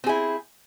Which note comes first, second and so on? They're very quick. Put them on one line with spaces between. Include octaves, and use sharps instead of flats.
C4 G#4 E4